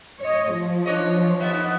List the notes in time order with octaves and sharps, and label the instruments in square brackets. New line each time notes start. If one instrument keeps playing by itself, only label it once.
[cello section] C#5 D#5
F3
[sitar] D4 C#5 D#5
D#2 B3 E5